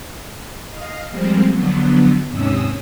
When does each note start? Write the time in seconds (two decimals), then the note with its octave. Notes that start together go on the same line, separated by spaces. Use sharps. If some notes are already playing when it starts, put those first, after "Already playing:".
0.70 D#5 F5
1.11 F3 G3 G#3 A#3 C4
1.51 D3 F3 F#3 B3
2.30 D#2 G#2 C3 C#4 D#6 E6